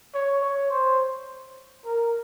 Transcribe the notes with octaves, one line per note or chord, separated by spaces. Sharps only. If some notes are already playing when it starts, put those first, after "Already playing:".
C#5
C#5
C5
A#4